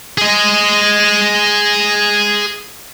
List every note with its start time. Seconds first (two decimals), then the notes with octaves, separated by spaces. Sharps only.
0.18 G#4 D#5